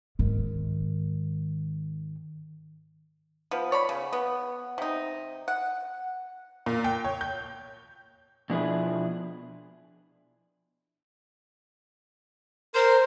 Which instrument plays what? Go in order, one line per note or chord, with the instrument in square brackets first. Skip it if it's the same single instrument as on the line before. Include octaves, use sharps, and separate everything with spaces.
[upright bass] G#2 D#3
[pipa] F3 B3
C#5 D5 B5
C#3
B3
C3 D#4
F#5
[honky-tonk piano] A#2
G5
C#5
G6
[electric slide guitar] B2 F3 D4 E4 G#4 B4
[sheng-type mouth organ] A#4 C6 [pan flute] C5